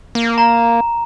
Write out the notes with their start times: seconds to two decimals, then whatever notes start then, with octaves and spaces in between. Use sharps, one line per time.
0.15 A#3
0.38 A#5